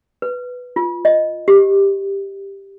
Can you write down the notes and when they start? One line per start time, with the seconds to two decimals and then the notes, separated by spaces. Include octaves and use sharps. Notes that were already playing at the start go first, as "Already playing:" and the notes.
0.22 B4
0.76 F4
1.05 D#5
1.48 G4